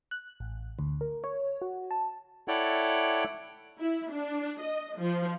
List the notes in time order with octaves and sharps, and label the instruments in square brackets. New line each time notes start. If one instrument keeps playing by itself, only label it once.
[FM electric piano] F#6
A1
D2
A#4
C#5
F#4
A5
[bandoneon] E4 A4 C#5 D5 F#5 G5
[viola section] E4
D4
D#5
F3